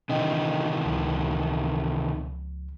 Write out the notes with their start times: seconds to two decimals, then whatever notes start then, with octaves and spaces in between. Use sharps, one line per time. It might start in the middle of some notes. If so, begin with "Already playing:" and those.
0.09 C3 D#3 E3 D4 D#5 G5
0.85 C#2 F3